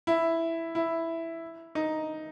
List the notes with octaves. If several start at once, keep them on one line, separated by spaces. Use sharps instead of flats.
E4
E4
D#4